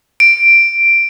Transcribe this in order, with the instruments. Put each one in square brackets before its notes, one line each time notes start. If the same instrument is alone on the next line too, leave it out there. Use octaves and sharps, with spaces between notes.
[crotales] D7